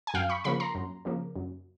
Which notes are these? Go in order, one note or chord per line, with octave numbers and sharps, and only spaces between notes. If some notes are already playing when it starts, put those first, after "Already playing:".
G#5
F#2 F5 G5
B5 C#6
C#3 F3 A#3 B5 C#6
A#5 C6
F#2
C#3 F3 A#3
F#2